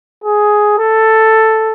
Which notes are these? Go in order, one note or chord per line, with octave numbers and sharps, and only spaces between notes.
G#4
A4